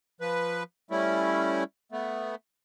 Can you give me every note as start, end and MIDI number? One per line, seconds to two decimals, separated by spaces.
0.21 0.63 53
0.21 0.63 71
0.91 1.64 55
0.91 1.64 57
0.91 1.64 61
0.91 1.64 64
1.92 2.35 57
1.92 2.35 59